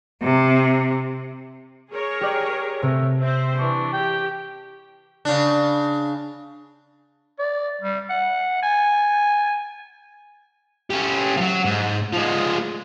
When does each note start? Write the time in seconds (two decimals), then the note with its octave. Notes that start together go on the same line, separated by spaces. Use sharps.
0.22 C3
1.91 G#4 A#4 C#5
2.21 G4 D5
2.82 C3 A3
3.20 C4 C5 E5
3.58 E3 D4 C#6
3.93 G4 G5
5.25 C#3 D4
7.39 D5
7.81 G3
8.09 F#5
8.63 G#5
10.90 C#4 G4
11.36 F3 F#3
11.65 G#2
12.13 F3 G#3